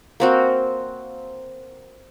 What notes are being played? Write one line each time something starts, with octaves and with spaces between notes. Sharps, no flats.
A#3 C4 F#4